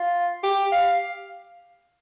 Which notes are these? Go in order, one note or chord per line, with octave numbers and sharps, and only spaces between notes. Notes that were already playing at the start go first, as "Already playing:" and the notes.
Already playing: F4
G4
F5